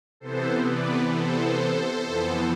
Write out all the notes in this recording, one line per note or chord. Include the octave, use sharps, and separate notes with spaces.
C3 E3 B3 A4 C5
B4 D5
A4 C5
F2 E3 B3